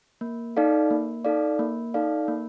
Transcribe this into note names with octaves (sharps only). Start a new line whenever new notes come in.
A#3
D#4 A4 D5 F5
A#3
D#4 A4 D5 F5
A#3
D#4 A4 D5 F5
A#3